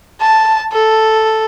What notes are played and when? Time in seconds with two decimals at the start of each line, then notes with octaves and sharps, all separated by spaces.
0.21 A5
0.72 A4